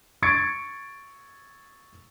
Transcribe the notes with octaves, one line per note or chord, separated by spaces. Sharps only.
C#6 G#6 A6 C#7 D7